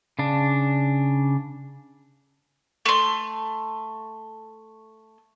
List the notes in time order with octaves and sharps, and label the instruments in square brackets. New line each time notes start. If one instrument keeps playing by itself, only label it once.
[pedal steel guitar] C#3 D4
[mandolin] A3 C6